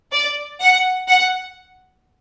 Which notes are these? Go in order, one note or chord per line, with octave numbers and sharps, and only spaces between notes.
D5
F#5
F#5